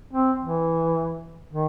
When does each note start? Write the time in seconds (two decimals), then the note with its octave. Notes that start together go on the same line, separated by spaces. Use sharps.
0.13 C4
0.41 E3
1.52 D#3